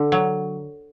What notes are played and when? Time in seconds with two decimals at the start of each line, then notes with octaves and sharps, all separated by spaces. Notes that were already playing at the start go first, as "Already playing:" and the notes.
Already playing: D3
0.12 F#3